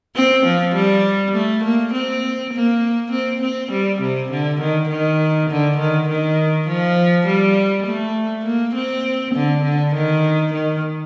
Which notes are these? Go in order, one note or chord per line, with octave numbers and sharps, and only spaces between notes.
C4
F3
G3
A3
A#3
C4
A#3
C4
C4
G3
C3
D3
D#3
D#3
D3
D#3
D#3
F3
G3
A3
A#3
C4
D3
D3
D#3
D#3